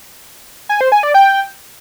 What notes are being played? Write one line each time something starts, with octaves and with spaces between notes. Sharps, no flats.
G#5
C5
G#5
D5
G5